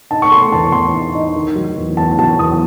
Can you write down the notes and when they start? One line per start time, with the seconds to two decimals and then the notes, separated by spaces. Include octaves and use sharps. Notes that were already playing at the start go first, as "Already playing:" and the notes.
0.11 D#4 A5
0.22 C#6
0.31 A3 C6
0.52 E2 A5
0.72 E2 C6
0.93 D#4
1.15 D#4
1.36 D#3
1.55 F#3
1.77 E2
1.97 E2 A5
2.19 F#3 A5
2.39 E2 D#6